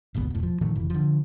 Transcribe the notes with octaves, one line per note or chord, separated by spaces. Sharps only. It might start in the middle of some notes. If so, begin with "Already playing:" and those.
D1 G1 C#2 B3
E1 A2
F3
A2 D#3 F3 A3
F1 E3
D3 F3